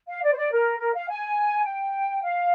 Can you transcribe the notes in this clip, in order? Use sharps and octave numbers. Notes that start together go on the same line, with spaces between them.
F5
D5
C5
D5
A#4
A#4
F5
G#5
G5
F5